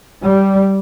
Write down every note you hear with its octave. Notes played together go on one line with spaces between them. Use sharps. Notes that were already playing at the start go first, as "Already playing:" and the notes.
G3